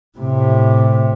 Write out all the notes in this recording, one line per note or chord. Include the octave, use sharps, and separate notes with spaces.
A2 C3